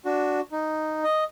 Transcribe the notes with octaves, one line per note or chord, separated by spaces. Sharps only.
D4 F#4
D#4
D#5